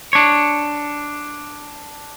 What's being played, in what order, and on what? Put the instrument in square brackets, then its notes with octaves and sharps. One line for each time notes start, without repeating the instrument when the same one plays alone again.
[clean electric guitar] D4 C#5